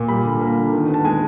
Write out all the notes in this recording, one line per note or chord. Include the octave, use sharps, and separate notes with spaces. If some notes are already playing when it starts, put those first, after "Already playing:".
Already playing: A#2
G3 B5
D3
A#3
D3
D#3
B3
A5
G#3 G#5